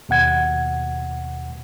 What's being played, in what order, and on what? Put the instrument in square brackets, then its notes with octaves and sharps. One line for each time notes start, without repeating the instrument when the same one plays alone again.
[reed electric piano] D#2 B2 F#5 G#6